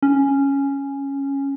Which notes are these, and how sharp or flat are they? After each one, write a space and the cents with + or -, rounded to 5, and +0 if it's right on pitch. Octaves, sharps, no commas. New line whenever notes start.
C#4 -5